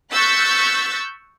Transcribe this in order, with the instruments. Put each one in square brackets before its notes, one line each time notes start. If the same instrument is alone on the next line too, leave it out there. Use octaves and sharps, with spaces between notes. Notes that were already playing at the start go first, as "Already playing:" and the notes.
[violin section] C#6 E6 F#6 G6 A6 B6